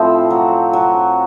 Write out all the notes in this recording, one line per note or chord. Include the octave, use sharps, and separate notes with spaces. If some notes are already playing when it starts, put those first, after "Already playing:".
Already playing: A2 F3 C4
F#3
F#3